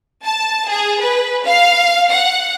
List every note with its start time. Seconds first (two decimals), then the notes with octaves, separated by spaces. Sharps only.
0.24 A5
0.69 G#4
1.01 B4
1.45 F5
2.12 F#5